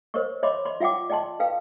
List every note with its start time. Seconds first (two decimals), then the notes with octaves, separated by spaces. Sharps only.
0.14 A#4 C5 C#5 D#5 C#6
0.43 C#5 D#5 E5 B5 C6 D6
0.65 D5 B5 C6
0.80 F4 E5 F#5 G5 D6
1.10 D5 D#5 G5 A5 C6
1.39 A4 B4 F5 G5